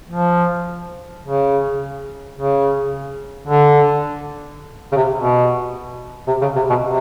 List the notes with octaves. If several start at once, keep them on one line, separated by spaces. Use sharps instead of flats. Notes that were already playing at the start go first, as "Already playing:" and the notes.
F3
C#3
C#3
D3
C#3
C3
B2
C3
C#3
C3
B2
C3